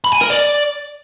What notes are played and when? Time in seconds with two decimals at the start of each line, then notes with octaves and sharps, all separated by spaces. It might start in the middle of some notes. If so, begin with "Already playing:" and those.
0.04 B5
0.13 G#5
0.21 A#4
0.30 D5